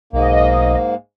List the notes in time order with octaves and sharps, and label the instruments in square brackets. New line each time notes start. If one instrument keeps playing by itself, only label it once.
[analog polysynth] B1 D#5 [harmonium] G#2 A#3